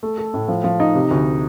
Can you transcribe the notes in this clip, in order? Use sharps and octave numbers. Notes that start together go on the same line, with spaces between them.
A3
A4
A2
F3
F3
D#4
C3
D2